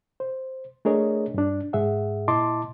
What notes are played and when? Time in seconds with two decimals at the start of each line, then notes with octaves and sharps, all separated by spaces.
0.20 C5
0.85 A3 D4 G#4 A#4 C#5 D#5
1.34 G2 D4
1.73 G#2 G#4 E5 F#5
2.28 A#2 E4 D#5 A5 C6 D6